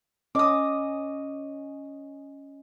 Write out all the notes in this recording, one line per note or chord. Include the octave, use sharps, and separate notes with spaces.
C#4 D#5 D6 D#6